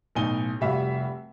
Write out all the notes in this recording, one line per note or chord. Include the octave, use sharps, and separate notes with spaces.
B1 A2 D#4 G#5 D#7 G7
F1 G3 F#4 E5 F5 B5